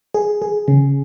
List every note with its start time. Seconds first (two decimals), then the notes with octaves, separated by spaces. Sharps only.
0.14 G#4
0.42 G#4
0.68 C#3